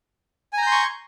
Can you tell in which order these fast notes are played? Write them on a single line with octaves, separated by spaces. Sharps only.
G#5 A#5 G6 C6 C#6